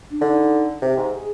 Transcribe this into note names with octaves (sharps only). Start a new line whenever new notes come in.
D4
D3 D#4
C3 G4 G#4
G#2
G#4